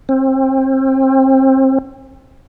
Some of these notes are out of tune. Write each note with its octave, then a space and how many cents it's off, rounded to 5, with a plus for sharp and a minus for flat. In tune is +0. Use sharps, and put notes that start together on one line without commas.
C4 +30